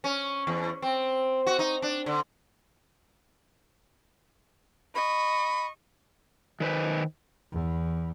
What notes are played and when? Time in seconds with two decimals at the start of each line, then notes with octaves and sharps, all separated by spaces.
0.04 C#4
0.47 E2
0.82 C4
1.47 F#4
1.59 D#4
1.82 D4
2.06 D3
4.95 D#5 B5 C#6
6.60 D#3 B4 C5
7.52 E2